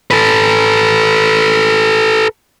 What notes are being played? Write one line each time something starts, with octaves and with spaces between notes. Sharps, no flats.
A4 B4